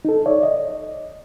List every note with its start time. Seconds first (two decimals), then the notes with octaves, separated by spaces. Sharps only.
0.05 D#4 A4
0.26 C#5 D5 E5
0.43 D#5